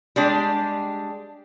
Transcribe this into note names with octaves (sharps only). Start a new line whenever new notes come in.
G3 G#3 D4